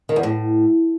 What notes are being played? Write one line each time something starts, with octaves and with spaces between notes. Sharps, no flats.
D#3
E2
A2